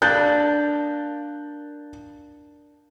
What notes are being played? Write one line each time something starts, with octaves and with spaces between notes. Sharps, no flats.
A#3 D4 F#6 G6 A6